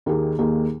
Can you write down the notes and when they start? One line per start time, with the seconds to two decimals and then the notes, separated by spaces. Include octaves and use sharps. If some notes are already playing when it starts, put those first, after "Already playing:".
0.06 D#2 D#3 A#3 D#4 G#4
0.38 D#2 D#3 A#3 D#4 G#4